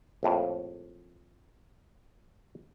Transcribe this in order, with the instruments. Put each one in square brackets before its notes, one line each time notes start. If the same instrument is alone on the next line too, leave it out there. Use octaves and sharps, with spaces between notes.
[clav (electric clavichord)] A#1 F2 A2